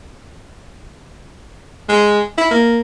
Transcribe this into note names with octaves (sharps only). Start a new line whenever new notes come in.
G#3
E4
A#3